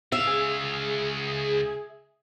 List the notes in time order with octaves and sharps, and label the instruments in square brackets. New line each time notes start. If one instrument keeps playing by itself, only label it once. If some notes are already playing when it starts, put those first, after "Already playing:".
[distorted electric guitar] C#2 F5 [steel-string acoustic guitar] E5
[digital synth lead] G#4